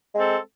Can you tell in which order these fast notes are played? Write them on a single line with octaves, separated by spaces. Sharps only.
G#3 C4 A4